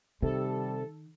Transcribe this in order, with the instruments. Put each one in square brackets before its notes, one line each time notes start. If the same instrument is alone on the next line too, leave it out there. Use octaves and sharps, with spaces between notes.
[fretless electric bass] C3 [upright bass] D#3 [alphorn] G3 [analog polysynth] A4